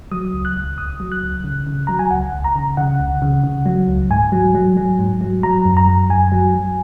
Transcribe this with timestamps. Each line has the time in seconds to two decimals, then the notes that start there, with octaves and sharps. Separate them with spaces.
0.11 F#3 D#6
0.33 C#2
0.45 F#6
0.56 C#2
0.78 C#2 D#6
1.00 F#3
1.12 F#6
1.22 C#2
1.44 C#3
1.67 C#3
1.87 F#3 A#5
1.99 G#5
2.10 C#2 F#5
2.33 C#2
2.44 A#5
2.55 C#3
2.77 C#3 F#5
3.00 C#2
3.22 C#3
3.44 C#3
3.66 F#3
3.88 C#2
4.10 G#2 G#5
4.32 F#3
4.55 F#3
4.77 F#3
4.99 G#2
5.21 F#3
5.43 F#3 A#5
5.65 F#2
5.77 A#5
5.88 F#3
6.10 F#2 G#5
6.32 F#3
6.54 F#3